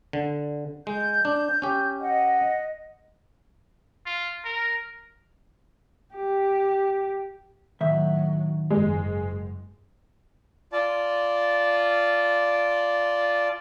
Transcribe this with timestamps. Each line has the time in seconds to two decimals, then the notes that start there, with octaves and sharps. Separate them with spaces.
0.13 D3
0.87 G#3 G6
1.25 D4
1.62 C#4 G4
2.00 D#5 F#5
4.06 F4
4.44 A#4
6.15 G4
7.81 A2 D#3 F#3 E5
8.70 F#1 G#2 G#3
10.72 F4 D5 A5